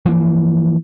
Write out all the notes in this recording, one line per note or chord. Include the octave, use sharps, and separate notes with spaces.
E3 F3 G#3 A#3